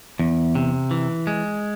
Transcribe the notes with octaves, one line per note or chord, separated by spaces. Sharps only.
E2
C3
E3
G#3